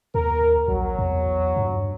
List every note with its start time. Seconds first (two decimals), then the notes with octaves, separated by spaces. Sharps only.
0.15 D#2 A#4
0.68 A#1 F#3
0.99 E2
1.56 G2